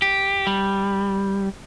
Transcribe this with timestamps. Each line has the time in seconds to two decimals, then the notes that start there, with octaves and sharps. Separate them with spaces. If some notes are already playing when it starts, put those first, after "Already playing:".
0.02 G4
0.47 G3